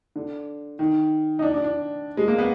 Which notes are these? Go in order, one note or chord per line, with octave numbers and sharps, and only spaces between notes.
D3
D#3
D#4
D4
D4
D4
G#3
A#3
B3